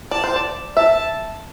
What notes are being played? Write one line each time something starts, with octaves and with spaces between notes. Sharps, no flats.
D5 A5
C5
D5
E5 A5